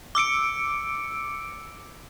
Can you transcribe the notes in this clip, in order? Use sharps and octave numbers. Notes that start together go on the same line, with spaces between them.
D6 E6 C#7 D7